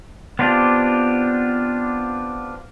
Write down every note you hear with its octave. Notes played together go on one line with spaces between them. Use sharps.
B3 C4 D4 F4 G4